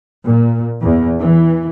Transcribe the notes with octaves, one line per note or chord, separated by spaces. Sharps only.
A#2
E2
E3